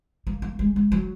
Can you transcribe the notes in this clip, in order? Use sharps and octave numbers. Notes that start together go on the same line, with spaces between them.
A#3
A#3
G#3
A#3
F#3